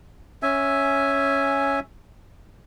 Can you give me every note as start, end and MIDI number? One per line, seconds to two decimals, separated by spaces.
0.43 1.80 61
0.43 1.80 76
0.43 1.80 80